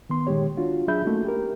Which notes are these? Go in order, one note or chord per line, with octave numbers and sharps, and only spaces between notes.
D#3 B3 C6
A#2 D#3 G#3 G4 C#5
D4 F4 F#4
F#3 D4 G#4 E5 B5 G6
A3 A#3 C#4 D#4 F#4
G4 A#4